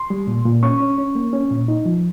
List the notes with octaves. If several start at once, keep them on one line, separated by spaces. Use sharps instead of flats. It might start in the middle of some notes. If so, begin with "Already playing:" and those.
Already playing: C6
G3
A#2
A#2
C#4 C#6
C#4
C#4
A#3
C#4
A#2
D#4
F3